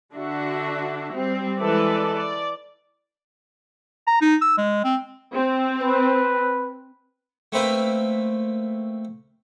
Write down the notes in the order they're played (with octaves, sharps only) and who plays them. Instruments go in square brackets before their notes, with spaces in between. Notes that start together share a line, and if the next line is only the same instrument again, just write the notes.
[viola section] D3 D4 F#4 E5
G3 C4
E3 G#3 A4 B4 D5 E5
D5
[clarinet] A#5
D#4
E6
G#3
C4
[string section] C4
[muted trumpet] B4
[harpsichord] A3 A#3 C4 B4 E5 F5